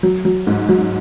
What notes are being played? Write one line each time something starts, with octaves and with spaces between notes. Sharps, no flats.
F#3
F#3
G#2
F#3